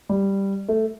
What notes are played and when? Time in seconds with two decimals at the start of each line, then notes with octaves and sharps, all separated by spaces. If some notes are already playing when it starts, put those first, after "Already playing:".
0.09 G3
0.68 A3